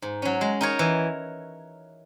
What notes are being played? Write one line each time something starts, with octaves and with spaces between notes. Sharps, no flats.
G#2
F#3 C#4
G#3
D#4 A#4 C#5
E3